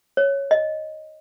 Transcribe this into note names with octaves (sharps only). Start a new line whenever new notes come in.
C#5
D#5